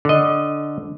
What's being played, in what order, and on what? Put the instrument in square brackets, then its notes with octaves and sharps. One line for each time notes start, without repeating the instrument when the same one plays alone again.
[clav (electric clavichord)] D3 D#5